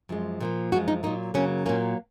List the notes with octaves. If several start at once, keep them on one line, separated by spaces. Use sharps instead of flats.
F#2 F3 G#3
A#2 F3 A#3
F#2 F3 G#3 F#4
D#4
A#2 F#3 A#3 D#4
F#2 C#3 F#3 A#3 C#4
A#2 F#3 A#3 C#4